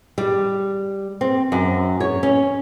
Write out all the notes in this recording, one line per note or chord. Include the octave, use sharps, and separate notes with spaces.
G3
C4
F#2
C#5
C#4